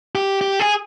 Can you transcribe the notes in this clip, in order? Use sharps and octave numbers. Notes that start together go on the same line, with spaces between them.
G4
G4
G#4